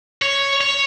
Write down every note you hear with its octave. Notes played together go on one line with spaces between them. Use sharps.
C#5
C#5